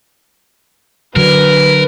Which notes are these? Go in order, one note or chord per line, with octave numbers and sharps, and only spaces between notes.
D3 F#3 A#4 B4